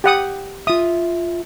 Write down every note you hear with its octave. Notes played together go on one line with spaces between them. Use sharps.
G4 F#5 D#6
F4 E5 D#6